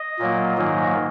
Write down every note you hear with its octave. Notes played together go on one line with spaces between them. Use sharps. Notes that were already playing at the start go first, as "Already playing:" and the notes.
Already playing: D#5
A#2 F#3 A#3
G#2 D#3 F#3 A#3